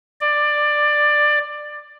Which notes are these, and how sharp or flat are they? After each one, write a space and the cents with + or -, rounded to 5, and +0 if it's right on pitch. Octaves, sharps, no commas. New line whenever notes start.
D5 +15